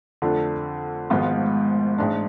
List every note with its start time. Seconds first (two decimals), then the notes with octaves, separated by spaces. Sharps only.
0.22 F2 D3 A3 D4
1.10 G#1 G#2 F3 B3 F4
1.98 A1 G#2 G#3 D4